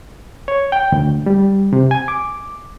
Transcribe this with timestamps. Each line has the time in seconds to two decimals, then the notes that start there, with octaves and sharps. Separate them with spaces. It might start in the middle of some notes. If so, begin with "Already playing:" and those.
0.48 C#5
0.72 G5
0.92 D2
1.26 G3
1.73 C3
1.91 G#5
2.08 D6